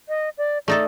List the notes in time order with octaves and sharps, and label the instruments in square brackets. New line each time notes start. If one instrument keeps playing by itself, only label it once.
[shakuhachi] D#5
D5
[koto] A3 D#4 A4 [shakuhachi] D5